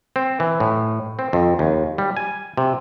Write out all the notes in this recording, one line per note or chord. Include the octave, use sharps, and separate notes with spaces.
C4
E3
A2
C4
F2
D#2
G3
G#5
C3